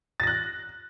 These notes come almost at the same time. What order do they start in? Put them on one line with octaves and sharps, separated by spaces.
A6 A#6 F#6